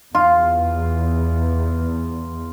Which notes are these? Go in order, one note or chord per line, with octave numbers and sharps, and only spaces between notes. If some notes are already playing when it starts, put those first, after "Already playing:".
E2 F4